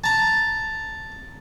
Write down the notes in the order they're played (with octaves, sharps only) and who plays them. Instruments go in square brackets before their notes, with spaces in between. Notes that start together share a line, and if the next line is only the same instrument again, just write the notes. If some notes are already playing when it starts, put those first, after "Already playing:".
[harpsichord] A5 A#5